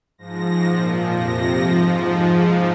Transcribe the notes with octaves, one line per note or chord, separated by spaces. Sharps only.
G#2 F3 A#6
A#2 F3
F2 C3 F3 A#6
G#2 F3
G#2 F3